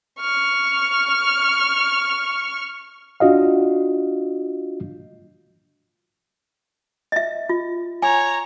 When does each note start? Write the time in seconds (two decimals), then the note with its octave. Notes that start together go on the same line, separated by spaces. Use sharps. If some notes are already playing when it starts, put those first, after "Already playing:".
0.19 C#6 F6
3.20 D4 F4 F#4 D#5 F5
7.12 D#5 E5
7.49 F4
8.02 C#5 G#5 A#5